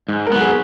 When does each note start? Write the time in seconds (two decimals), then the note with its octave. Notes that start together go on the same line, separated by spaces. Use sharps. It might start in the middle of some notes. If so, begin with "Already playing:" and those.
0.09 G#2
0.27 A#4
0.32 F#3 B3
0.41 G#4